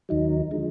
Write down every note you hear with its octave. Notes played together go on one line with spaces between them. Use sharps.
D#2 D#3 F#3 D#4
D3 F3 G#3